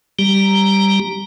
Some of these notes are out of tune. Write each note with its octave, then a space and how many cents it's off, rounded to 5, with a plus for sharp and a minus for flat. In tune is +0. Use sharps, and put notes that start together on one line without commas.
G3 +0 G4 +0 A#5 +0